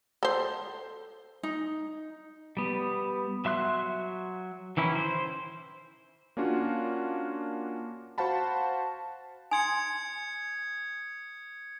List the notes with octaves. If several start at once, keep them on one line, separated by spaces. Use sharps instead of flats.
A4 C5
D#4
G3 B3
F#3 E5 C6 F#6
D#3 E3 C#4 E4
C5
A#3 C#4 D4 F4 F#4
F#4 C5 F5 F#5 A5 B5
G#5 C6 D#6 G#6 C#7